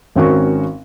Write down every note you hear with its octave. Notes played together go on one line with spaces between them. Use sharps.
G#1 C4 C#4 F#4 A#4 C#6